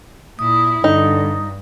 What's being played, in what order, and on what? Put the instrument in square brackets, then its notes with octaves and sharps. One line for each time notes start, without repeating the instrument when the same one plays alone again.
[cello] A#2 E4 [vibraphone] D#6
[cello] G2 [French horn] D3 [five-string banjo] D#4